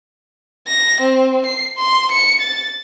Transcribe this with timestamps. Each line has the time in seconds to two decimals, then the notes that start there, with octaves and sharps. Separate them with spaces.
0.67 A#6
1.01 C4
1.46 C7
1.77 C6
2.12 C#7
2.41 A6